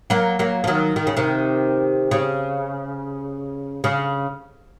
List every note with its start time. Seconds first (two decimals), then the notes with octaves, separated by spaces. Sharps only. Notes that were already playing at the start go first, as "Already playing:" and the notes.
0.10 F#3 A#3
0.39 F#3 A#3
0.64 F3
0.67 D#3 F#3
0.96 D#3
1.07 C#3
1.17 C3 D#3
2.11 C#3
3.84 C#3